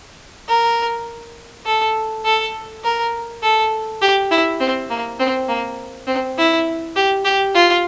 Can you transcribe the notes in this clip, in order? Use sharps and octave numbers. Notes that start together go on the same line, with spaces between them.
A#4
A4
A4
A#4
A4
G4
E4
C4
A#3
C4
A#3
C4
E4
G4
G4
F4